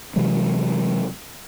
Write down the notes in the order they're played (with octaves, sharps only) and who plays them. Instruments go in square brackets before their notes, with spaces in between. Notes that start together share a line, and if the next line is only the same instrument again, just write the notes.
[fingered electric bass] C3 E3 F#3 G#3